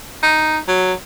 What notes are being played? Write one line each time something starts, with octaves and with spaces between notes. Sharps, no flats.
D#4
F#3